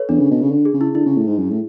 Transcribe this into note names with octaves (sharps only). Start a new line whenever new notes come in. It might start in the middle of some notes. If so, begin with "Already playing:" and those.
Already playing: A4 B4 C#5
E2 D4
C#3
B2
C#3
D3
G#4
C#3
E4
D3 E4
C#3
A2
G#2
F#2
A2